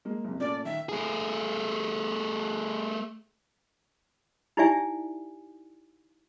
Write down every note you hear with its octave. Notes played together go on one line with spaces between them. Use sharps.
G#3 A#3
F#1 C3
A#2 A3 C#4 D5
D#3 E5
A3 G#4
D#4 E4 G4 D5 E5 G#5